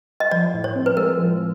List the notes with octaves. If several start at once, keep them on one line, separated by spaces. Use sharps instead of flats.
D#5
F3 D5
A2
C#5
C4
B4
G#3 A#4
F3